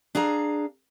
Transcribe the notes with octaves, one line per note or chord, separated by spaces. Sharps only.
D4 G#4 F5 A#5